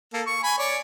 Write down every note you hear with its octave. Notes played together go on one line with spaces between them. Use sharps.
A#3 A4
C#6
G#5 B5
C#5 D5